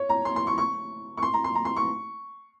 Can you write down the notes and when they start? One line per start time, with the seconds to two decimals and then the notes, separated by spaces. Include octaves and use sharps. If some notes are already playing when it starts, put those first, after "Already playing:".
Already playing: C#5
0.09 A#5
0.25 C6
0.36 C6
0.47 C#6
0.58 C#6
1.17 C#6
1.23 C6
1.34 A#5
1.44 C6
1.55 A#5
1.65 C6
1.76 C#6